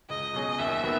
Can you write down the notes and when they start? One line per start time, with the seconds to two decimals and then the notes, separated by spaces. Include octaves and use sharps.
0.09 C#2 D#5
0.34 B2 F#3 C#4 G#4
0.58 D#2 E5
0.84 D#3 B3 F#4